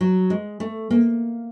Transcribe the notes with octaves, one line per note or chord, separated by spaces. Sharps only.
F#3
G#3
A3
A#3